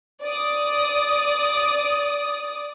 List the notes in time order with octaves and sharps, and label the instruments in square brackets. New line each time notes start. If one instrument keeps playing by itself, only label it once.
[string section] D5 D#6